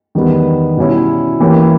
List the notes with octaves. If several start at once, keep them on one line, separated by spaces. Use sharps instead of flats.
E2 D#3 G3 B3
B2 G3 C#4 E4
E3 A#3 C#4 G4